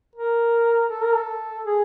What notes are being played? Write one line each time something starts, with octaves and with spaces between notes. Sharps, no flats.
A#4
A4
A#4
A4
G#4